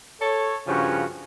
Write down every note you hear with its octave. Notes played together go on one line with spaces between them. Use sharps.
A4 C#5
G2 C#3 F3 C#4 F#4